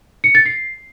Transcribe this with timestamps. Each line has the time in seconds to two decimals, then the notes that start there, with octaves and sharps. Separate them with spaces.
0.24 C#7
0.35 A6
0.46 C7